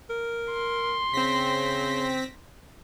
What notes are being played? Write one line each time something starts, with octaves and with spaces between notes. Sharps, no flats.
A#4
C6
C#3 C4 A#6 B6